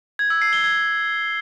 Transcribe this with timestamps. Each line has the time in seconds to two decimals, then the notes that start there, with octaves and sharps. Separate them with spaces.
0.19 G#6
0.30 E6
0.42 C7
0.53 G7
0.64 G#6